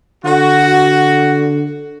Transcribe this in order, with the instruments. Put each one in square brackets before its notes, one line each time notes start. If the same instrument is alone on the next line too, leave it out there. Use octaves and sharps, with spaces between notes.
[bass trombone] D3 [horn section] F#4